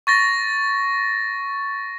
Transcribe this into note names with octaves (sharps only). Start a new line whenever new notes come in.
C#6 A6 A#6